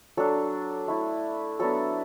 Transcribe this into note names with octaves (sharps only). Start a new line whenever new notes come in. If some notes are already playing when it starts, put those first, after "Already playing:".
F#3 D4 A4
A3 E4
F#3 B3 D4 A4